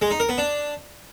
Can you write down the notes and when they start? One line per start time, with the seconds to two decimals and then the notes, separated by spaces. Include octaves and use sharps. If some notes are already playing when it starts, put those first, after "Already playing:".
0.02 G#3
0.11 D#4
0.20 A#4
0.29 B3
0.38 D4